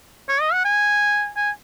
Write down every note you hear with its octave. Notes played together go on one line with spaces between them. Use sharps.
C#5
D#5
F#5
G#5
G#5